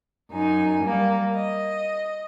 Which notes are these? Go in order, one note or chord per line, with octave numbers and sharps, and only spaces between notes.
F#2 D#4 G#5
G3 A#3
D#5